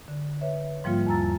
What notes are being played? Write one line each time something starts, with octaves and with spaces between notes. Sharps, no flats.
D3
B4 C#5 E5
G#2 F3 G3 A#3 F4
E2 A5 A#5 E6 A6